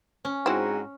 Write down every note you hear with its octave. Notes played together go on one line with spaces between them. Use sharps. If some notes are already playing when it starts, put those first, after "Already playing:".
C#4
G#2 C4 E4 F#4